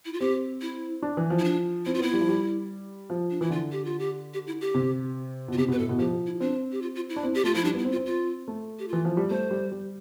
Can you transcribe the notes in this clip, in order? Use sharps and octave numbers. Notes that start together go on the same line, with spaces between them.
E4
F4
C4 G4
E4
D4
E3
F3
E4
D4
C4 E4
F4
B3 E4
G3
F3
G3
F3
D4
E3 E4
D3 F4
G4
F4
G4
G4
E4
G4
C3
B2
F4
C3 G4
B2 B4
A2 A4
B2
F3 G4
E4
C4 D4
G4
F4
F4
E4
D4
C4
G4
A3 F4
F3 E4
G3 D4
B3 E4
C4
F4
C4
F4
A3
G4
E3 F4
F3
G3
A3 C5
G3
G3